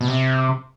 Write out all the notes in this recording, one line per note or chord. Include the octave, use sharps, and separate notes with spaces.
B2
C3